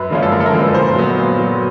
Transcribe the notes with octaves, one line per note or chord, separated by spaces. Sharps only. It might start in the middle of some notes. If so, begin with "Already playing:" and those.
Already playing: F#2 B4
D3 F3 G#3 C#4
A4
F#2 A#4
A4
A#4
D3 F3 G#3 C#4
B4
A#2 C5
F#3 B3
A#2
F#3 B3